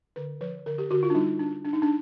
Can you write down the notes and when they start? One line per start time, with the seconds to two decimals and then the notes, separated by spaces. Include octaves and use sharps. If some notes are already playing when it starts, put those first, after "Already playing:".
0.16 D3 B4
0.41 F3 B4
0.66 D3 A#4
0.78 G4
0.91 D3 F#4
1.03 F4
1.10 D4
1.15 G3 D#4
1.40 D4
1.65 D4
1.73 D#4
1.82 D4